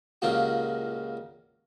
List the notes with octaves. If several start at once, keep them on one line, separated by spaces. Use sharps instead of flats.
C#2 A#2 C#3 A#3 F#4 G4